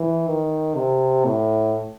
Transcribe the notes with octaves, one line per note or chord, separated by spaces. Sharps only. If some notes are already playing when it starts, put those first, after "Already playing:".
Already playing: E3
D#3
C3
A2